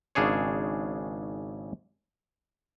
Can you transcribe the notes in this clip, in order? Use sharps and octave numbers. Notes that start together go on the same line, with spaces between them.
G#1 C#3 D4 G#4 C#5